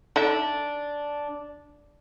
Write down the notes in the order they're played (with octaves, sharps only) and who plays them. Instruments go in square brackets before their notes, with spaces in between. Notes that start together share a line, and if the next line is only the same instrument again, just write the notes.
[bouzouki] D4 [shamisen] D#4 A4 E5